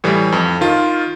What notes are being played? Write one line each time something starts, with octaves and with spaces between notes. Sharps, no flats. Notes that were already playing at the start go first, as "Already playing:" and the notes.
A2 E3 G3
F2
D#3 F4